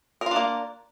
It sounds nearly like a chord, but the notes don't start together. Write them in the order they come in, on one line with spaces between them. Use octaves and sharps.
A#4 F4 D4 A#3